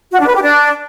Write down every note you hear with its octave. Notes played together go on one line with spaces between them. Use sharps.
F#4
D4
B4
G4
D4